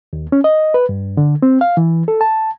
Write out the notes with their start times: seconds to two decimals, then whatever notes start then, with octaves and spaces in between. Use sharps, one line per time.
0.13 D#2
0.32 C#4
0.44 D#5
0.74 B4
0.89 G2
1.17 D3
1.42 C4
1.61 F5
1.77 E3
2.08 A4
2.21 A5